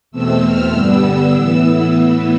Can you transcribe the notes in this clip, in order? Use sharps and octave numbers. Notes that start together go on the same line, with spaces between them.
E2 B2 A3 C4 E6
F6
G2 D3 G3 B3 E6
E6
A2 E3 B3
E6
A2 E3 B3